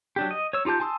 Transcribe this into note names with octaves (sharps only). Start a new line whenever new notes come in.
F#3 D4 G4
D#5
C#5 E6
D#4 F4 G4 A5 G6
G#5 A5 C6 D#6 E6